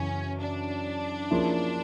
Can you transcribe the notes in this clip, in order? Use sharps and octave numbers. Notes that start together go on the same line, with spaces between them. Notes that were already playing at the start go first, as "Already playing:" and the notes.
Already playing: F#2 C#3 E3 C#4
D4
F3 A#3 C#4 E4 G#4